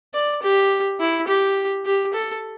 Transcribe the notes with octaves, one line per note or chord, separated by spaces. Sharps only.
D5
G4
E4
G4
G4
A4